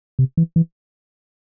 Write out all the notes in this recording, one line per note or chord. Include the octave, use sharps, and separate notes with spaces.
C3
E3
E3